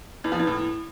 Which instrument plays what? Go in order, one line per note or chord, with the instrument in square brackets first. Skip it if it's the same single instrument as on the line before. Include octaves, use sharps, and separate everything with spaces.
[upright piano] E2
F3
E2
A2